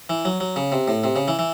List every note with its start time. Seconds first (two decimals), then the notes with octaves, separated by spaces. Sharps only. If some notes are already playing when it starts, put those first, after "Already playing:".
0.09 E3
0.25 F#3
0.40 F#3
0.56 C#3
0.72 C3
0.88 A2
1.04 C3
1.16 C#3
1.28 E3
1.39 E3